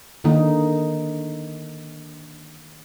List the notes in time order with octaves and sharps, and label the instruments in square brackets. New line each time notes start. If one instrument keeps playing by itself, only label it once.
[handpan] D3 D#3 A#3 D#4